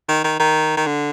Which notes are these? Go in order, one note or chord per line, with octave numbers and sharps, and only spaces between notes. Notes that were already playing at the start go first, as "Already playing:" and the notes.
D#3
D#3
D#3
D#3
D3